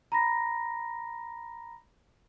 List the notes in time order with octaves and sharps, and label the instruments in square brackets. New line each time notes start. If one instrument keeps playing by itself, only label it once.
[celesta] A#5 B5 A#6